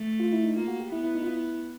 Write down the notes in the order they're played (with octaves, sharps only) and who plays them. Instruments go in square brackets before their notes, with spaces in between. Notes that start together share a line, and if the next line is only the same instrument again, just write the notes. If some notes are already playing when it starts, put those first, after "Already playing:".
Already playing: [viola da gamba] A3
[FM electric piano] F4
E4
D#4
[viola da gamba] A#3 [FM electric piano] F4
[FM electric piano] F#4
G4
[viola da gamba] B3 [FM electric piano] E4
[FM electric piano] E4
D#4
F4
E4